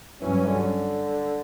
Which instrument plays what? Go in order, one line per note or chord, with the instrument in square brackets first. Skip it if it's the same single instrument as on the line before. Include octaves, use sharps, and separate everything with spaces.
[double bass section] G2 F#3 C#4 [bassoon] E3
[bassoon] D3